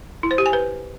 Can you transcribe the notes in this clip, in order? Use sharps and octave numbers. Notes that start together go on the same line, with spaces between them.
E4
C5
G4
G#5
B4